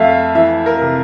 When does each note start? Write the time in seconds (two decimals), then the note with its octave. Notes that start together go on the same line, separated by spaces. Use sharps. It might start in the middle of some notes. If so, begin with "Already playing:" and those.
Already playing: F2 A3 E5 F5
0.35 E3 E5
0.66 A#4
0.82 C3